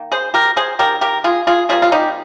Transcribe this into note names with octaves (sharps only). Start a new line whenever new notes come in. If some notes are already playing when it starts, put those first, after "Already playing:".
Already playing: D#3 A#3
G#4 C5
G4 A#4
G#4 C5
D#3 A#3 G4 A#4
G4 A#4
F4 G#4
F4 G#4
C3 G3 A#3 F4 G#4
F4
D#4 G4